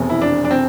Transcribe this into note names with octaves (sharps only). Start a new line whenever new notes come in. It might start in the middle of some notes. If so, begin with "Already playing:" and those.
Already playing: F1 E2 B2
E4
D4
D4
C4